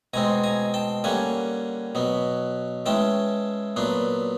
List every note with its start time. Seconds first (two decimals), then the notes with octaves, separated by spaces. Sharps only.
0.14 B2 G#3 C4 G#5 A#5
0.44 G#5 A#5
0.74 G5 A5
1.04 D3 G3 A#3 C#4 F#5 G#5
1.95 B2 F#3 B3
2.86 E3 G#3 C#4 G5 A5
3.76 A#2 F#3 B3 D4